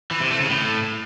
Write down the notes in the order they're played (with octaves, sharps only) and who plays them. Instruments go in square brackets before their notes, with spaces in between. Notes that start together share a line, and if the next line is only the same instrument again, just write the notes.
[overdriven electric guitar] E3
C3
A3
C#3
A2